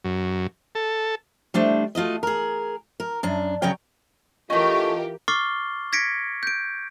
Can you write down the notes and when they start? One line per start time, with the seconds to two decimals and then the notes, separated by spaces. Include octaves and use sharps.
0.04 F#2
0.75 A4
1.54 G3 A3 D4 C5
1.95 A3 F4 F#4 D#5
2.23 G#4 A#4
3.00 A#4
3.23 F#2 D4
3.62 C#3 F#3 A#4 C#5 G5
4.50 E3 A3 C#4 F4 G4 A#4 D#5
5.28 C#6 D6 F6 A6 C7 G7
5.93 G#6 A#6 B6 C#7 D7
6.43 G6 D7